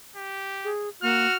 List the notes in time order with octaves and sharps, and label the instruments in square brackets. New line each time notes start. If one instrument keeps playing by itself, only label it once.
[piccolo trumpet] G4
[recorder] G#4
[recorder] A#3 [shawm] F#4 [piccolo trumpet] F6